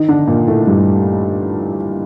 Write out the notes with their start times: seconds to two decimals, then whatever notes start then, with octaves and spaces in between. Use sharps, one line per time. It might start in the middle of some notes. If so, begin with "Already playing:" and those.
Already playing: D#3 D#4
0.09 D3 D4
0.27 A#2 A#3
0.47 A2 A3
0.67 G2 G3